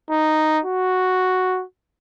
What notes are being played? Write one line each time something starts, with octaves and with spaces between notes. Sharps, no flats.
D#4
F#4